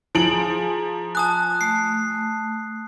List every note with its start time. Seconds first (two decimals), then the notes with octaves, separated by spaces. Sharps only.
0.15 F3 G#4 G#5 A#5 D7 F#7
1.15 G#5 A5 D#6 F#6
1.61 A3 C7